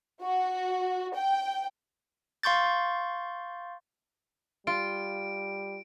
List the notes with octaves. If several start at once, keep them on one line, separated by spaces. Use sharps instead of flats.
F#4
G5
F5 C6 C#6 G6 A6
G3 F4 D7